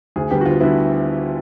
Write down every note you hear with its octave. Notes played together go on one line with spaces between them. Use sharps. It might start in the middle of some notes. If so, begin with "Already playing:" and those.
D2 G#4
D3 G3 B3 G4
F#4
D2 F4
D3 G3 B3 E4